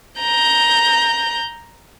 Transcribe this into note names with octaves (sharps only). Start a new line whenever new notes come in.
A#5 G6